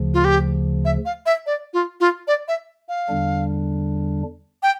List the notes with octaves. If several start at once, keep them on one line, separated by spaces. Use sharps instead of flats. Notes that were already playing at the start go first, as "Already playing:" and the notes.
Already playing: D2 C#3 F3
F4
G4
E5
F5
E5
D5
F4
F4
D5
E5
F5
E2 D3 G3 D4
G5